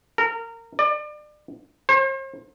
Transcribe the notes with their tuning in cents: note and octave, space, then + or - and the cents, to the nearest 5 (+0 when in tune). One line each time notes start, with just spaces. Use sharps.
A#4 -25
D5 +35
C5 +45